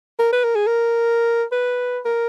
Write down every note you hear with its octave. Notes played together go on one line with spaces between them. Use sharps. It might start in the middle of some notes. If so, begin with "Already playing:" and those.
A#4
B4
A#4
G#4
A#4
B4
A#4